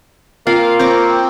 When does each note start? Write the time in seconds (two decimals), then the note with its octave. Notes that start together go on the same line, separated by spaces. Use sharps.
0.47 A#3 C4 F4 F5
0.79 C4 C#5 A#5 D6